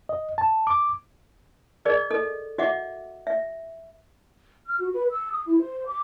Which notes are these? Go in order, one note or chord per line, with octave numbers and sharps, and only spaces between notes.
D#5
A5
D6
G#4 A#4 D5 D#5
A4 D#5
F#4 D#5 E5 F#5 D6
E5
F6
F#4
B4
E6
D#6
E4
C5
D6